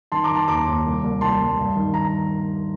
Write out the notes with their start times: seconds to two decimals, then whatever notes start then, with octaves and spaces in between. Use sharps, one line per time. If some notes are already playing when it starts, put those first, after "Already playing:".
0.12 D#3 A5 C6
0.24 A#5 D6
0.31 D#3
0.36 A5 C6
0.48 D#2 A#5 D6
0.67 D#2
0.85 C2
1.04 C2
1.21 C2 A5 C6
1.40 C2
1.58 G2
1.76 D#3
1.94 A#5